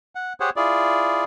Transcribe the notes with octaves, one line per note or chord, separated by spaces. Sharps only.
F#5
G4 G#4 C5 C#5 F#5
E4 F4 G#4 D5